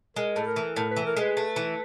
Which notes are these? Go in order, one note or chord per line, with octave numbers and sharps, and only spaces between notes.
G#3 A#4
A2 A4
A#4
E3
A2 A#4
B4
E3
A#4
G#3 B4
A3
E3